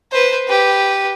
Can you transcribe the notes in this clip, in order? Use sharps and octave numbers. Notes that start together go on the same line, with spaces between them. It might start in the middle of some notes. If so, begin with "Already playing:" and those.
B4 C5
G4 B4